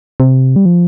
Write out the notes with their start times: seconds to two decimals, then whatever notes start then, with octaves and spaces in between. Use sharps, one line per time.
0.20 C3
0.56 G3
0.66 F3